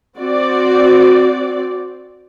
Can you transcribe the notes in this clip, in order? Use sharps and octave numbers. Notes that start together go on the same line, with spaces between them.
C4 F#4 D5